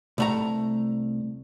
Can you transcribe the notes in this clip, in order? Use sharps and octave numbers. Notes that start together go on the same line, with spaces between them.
C2 A3 A#5